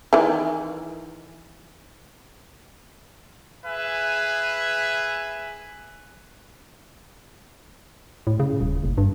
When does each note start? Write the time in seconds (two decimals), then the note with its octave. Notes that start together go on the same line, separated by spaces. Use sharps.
0.13 D#3 E3
3.65 G#4 B4 E5 G#5
8.27 A2
8.40 C#3
8.60 D#1
8.84 F#1
8.98 G2